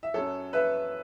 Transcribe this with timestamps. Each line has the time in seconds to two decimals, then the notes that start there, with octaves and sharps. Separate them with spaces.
0.03 E5
0.14 F#2 F#3 A4 C#5
0.53 B4 E5